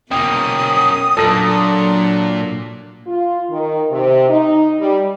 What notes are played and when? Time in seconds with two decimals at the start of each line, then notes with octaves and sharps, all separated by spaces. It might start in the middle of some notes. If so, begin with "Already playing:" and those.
0.11 B2 A#3 C#4 G5 D#6
1.17 A#2 F#3 D4 A4 A#6
3.07 F4
3.50 D#3
3.91 C3
4.30 D#4
4.80 G3